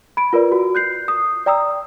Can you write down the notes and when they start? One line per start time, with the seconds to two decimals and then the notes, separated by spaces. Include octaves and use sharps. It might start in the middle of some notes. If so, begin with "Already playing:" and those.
0.17 B5 D7
0.33 F4 A#4 B4 D5
0.52 F#4
0.75 F#6 G6 C7
1.08 D#6
1.46 D5 G5 A#5 D#6 E6